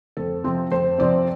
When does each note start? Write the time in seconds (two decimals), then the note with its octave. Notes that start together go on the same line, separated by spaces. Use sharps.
0.17 F2 A4
0.44 C3 F3 C4
0.71 F2 C5
0.98 C3 F3 C4 D5